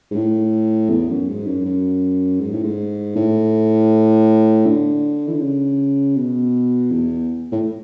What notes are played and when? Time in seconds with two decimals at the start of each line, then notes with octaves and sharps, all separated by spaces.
0.11 G#2
0.15 A2
0.90 E2
1.09 F#2
1.29 G#2
1.47 F#2
1.66 F#2
2.40 G#2
2.52 A2
2.63 G#2
3.16 A2
4.66 D3
5.27 E3
5.34 D3
5.41 C#3
6.17 B2
6.91 E2
7.52 A2